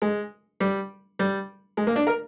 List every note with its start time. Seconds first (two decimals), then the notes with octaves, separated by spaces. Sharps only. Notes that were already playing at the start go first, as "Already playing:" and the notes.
0.02 G#3
0.60 G3
1.19 G3
1.77 G#3
1.87 A#3
1.96 D4
2.07 A#4